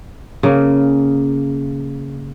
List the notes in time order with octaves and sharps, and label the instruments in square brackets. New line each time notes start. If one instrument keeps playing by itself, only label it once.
[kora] C#3 A#3